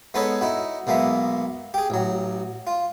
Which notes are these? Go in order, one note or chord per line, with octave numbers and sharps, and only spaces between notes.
G#3 B3 D#4 A4 B4 C#5
D#4 E4 F#4
B1 G#3 A#3 B3 E5
G4 G#4
A1 F#3
F4